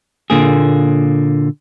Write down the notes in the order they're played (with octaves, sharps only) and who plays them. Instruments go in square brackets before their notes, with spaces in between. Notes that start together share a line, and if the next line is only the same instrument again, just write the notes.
[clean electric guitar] A#2 D3 A#3 G#4